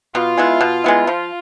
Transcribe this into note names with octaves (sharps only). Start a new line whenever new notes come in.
B2 F4
G#3 B3 E4
B2
G#3 B3 E4
F3 F4